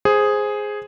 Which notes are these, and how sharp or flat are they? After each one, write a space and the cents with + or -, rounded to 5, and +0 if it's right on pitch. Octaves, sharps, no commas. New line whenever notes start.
G#4 +0 C5 +0